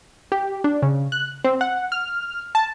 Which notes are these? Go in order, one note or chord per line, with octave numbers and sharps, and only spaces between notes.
G4
D4
C#3
F#6
C4
F#5
F6
A5